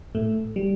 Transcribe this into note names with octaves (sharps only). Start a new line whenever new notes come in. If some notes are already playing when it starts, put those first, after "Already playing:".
A2 A3
G3